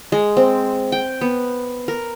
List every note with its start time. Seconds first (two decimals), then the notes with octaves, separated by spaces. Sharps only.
0.12 G#3
0.37 C4
0.92 G5
1.21 B3
1.88 A#4